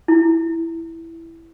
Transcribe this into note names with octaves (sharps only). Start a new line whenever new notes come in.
E4